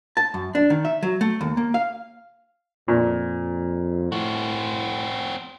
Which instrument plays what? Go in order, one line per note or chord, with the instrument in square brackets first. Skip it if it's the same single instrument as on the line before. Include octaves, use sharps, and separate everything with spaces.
[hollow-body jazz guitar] A5
F#2
D4
D#3
E5
F#3
A3
D#2
A#3
F5
[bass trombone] F2 [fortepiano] A#2
[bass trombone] A2 [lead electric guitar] C4 F#4